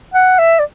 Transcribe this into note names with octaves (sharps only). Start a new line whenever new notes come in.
F#5
E5
D5